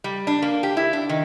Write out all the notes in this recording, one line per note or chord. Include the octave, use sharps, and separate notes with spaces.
G3
D4
A#3
G4
E4
D4
D#3